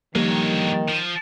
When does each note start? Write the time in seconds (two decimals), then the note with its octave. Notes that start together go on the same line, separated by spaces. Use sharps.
0.15 D3 D#3 F3 G3 A#3 G4 C#5
0.89 F3